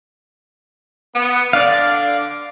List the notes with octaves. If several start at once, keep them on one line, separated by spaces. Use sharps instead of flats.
B3
D3 D4 D5 F5